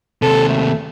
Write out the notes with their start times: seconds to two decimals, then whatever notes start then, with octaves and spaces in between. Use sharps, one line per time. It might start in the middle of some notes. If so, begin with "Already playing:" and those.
0.22 D#2 C3 A4
0.48 A3